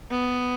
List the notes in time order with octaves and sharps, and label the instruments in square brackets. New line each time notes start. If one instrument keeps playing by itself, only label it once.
[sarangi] B3